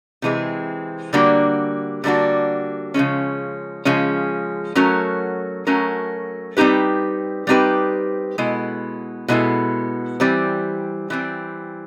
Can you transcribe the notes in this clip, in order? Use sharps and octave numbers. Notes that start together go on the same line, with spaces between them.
C3 E3 G#3 C4
D3 G3 A#3 D4 F#4
D3 G3 A#3 D4 F#4
C#3 F3 G#3 C#4
C#3 F3 G#3 C#4
F#3 A3 C#4 F#4 A#4
F#3 A3 C#4 F#4 A#4
G3 C4 D#4 G4 B4
G3 C4 D#4 G4 B4
B2 G#3 B3 E4 A4
B2 G#3 B3 E4 A4
E3 G3 C4
E3 G3 C4